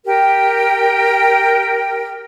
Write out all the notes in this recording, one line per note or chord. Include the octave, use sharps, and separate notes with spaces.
G4 A#4 G5